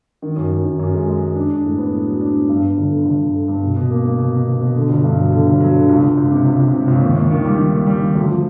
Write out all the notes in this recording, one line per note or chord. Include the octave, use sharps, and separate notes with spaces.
D#3
F#2
F#2
D#3
F#2
G#3
G#3
G#3
D4
D4
A2
B3
A2
F#3
D4
B3
G2
G2
G1
D3
G1
G1
D3
G2
B2
B2
A#3
A#3
B2
B2
B2
B2
D3
G1
G2
F#3
D3
G1
F#3
D3
C#2
C#2
C#2
C3
C#2
C#2
C3
C#2
D#2
D#2
D#3
G3
D#3
D#2
G3
D#3
D2
F3